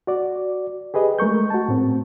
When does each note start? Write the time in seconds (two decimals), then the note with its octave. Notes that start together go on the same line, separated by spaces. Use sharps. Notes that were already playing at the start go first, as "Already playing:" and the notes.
0.07 F#4 D5
0.94 G4 G#4 B4 D#5
1.19 G#3 A3 A#4 C#6 G6
1.50 F#4 A5
1.68 A2 C4